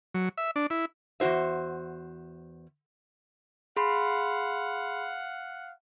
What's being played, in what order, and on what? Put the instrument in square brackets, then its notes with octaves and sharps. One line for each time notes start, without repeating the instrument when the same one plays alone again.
[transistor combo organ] F#3
E5
D4
E4
[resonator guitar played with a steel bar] E2 D#3 F#4 C5 E5
[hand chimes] G#4 B5 C6 [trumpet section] F5 F#5